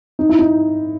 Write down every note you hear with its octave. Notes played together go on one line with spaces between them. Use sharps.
D#4
E4
D#4